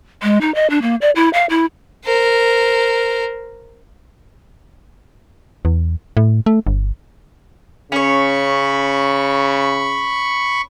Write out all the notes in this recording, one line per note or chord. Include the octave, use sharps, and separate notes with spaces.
G#3
D#4
D#5
D4
A#3
D5
E4
F5
E4
A#4 C5
E2
A2
A3
G1
C#3 C#4 C#5 B5 C#6